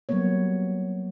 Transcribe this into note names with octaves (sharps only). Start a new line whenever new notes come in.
F#3 G3 A#3 B3 C#5